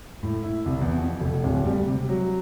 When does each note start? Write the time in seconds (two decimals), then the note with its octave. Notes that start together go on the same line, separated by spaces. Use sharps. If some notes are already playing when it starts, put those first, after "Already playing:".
0.23 A2
0.43 E4
0.66 C2
0.81 E2
0.98 F2
1.20 F1
1.44 D1
1.66 G3
1.87 C3
2.09 F#3